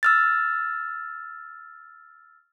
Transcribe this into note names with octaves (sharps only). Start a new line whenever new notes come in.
E6 F6 A6